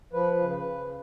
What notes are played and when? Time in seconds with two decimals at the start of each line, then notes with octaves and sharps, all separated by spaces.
0.13 F3 B4
0.38 C#3
0.50 B4
0.64 C#3